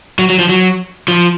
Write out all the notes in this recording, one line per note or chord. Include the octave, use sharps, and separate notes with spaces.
F#3
F#3
F3
F#3
F3